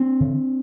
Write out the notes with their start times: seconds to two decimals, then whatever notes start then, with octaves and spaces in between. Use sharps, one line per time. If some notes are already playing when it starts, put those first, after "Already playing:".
Already playing: C4 D4
0.20 D3